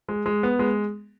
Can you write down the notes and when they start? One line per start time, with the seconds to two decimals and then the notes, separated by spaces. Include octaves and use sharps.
0.09 G#3
0.26 G#3
0.43 B3
0.59 G#3